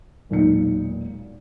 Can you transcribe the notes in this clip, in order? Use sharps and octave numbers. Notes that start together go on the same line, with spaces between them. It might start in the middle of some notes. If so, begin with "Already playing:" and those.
E1 B1 A#2 D#4 C#7